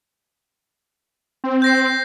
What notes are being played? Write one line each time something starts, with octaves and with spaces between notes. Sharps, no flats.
C4
G6 A#6 C7